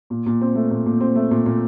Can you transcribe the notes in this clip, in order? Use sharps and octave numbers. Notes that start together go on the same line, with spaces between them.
A#2
A#2
C4
A3
A#2
A#2
C4
A3
A#2
A#2